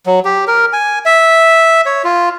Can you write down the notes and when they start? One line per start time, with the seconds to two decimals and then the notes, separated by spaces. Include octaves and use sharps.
0.06 F#3
0.25 G4
0.47 A#4
0.73 G#5
1.05 E5
1.86 C#5
2.04 F4